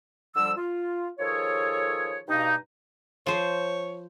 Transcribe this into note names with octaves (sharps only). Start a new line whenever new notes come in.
F2 D3 F3 G3 E6
F4
D#3 F3 G#4 A4 C#5
G2 B2 A#3 D#4
F3 C5 C#5